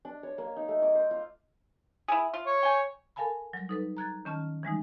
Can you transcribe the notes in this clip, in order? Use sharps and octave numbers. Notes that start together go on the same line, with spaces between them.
D4
C#5
A#3
D#4
A3
D6
C5
F4
E4 G#4
F4
C#5
G5 G#5
A4 A#4 F5 G#5 A5 B5
F#3 G3 A#6
D#4 A4 B4
A#5 F#6 G#6 A6
D#3 C#4 A5 F6
E3 G3 G#3 D#4